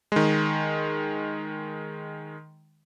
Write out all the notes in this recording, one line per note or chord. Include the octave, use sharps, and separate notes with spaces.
D#3 G#3